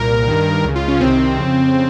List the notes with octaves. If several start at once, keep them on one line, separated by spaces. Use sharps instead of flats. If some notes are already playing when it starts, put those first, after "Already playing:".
Already playing: C2 A#2 A#4
G2 D#3
C#2 C#3
F4
C#4
C2 C3 D#3 C4
F2 C#3